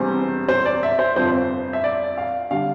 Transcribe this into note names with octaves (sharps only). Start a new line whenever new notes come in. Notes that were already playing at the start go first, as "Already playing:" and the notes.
Already playing: E1 E2 C3 G3 C5
C5
D5
E5
C5
G1 F2 C3 F3 C5
E5
D5
F5
D3 G3 F5